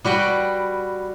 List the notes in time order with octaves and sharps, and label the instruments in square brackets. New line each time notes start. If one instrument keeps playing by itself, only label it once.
[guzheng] G3 F#4 B4 G5